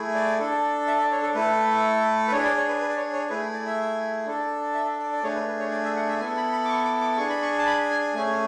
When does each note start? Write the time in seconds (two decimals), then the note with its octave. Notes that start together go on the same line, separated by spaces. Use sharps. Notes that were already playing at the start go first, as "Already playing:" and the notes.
Already playing: A3 E4 G#4
0.15 D5
0.39 D4 A4
0.88 E5
0.99 D5
1.11 C#5
1.23 A4
1.35 A3 E4 A4 B4
2.28 B4
2.32 D4 G#4 C#5
2.45 D5
2.57 C#5
2.68 B4
2.82 B4
2.89 D5
2.97 C#5
3.13 C#5
3.29 A3 E4 G#4 B4
3.53 D5
3.66 E5
4.26 D4 A4
4.74 E5
4.99 D5
5.13 D5
5.23 A3 D4 G#4 C#5
5.35 B4
5.48 B4
5.60 C#5
5.72 D5
5.85 E5
5.96 F#5
6.09 E5
6.20 B3 E4 A4 G#5
6.37 B5
6.52 B5
6.65 D6
6.70 C#6
6.85 D6
7.01 D6
7.17 D4 G#4 C#6
7.30 B5
7.42 C#6
7.58 A5
7.66 B5
7.90 G#5
8.14 A3 C#4 G#4 G#5